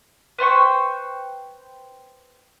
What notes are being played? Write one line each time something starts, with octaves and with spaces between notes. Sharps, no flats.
B4 C5 G5 C#6